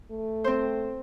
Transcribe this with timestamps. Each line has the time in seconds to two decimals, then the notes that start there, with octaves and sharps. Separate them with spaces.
0.11 A3
0.44 C4 C5